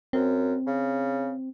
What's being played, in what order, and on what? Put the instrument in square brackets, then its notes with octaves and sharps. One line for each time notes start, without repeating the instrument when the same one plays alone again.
[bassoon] F#2 [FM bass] C4
[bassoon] C#3